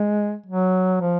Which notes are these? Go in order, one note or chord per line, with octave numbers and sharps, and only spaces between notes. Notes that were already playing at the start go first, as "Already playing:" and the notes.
Already playing: G#3
F#3
F3